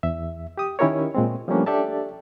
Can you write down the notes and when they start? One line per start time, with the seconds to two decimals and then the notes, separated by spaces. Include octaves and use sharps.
0.03 E2 E5
0.58 G4 D#6
0.79 D#3 C#4 E4 G4 A#4 C#5
1.15 A#2 G#3 C4
1.48 F3 G3 A3 A#3 C#4 D4
1.66 D4 G4 A4 D5 E5 A5